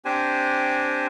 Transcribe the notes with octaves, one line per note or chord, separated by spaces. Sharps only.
C4 D4 G4 C5 G#5